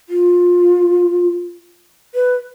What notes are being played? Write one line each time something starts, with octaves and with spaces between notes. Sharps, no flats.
F4
B4